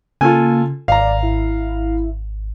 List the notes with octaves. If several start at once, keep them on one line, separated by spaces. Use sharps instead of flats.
C#3 A#3 F4 A4 G#5
G#1 D5 F5 A#5
E4